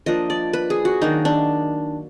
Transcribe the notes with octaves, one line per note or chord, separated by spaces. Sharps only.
F3 A#3 D4 D#5
D5
B4
G#4
F#4
D#3 F#3 A#3 D4 D#4
D4